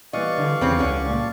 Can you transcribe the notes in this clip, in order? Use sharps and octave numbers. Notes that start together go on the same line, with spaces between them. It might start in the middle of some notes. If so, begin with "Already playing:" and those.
E3 G3 B3 D5 D#5 F5 C#6
D3
E2 C#3 C4
C#2 D3 C#4
G2 A#2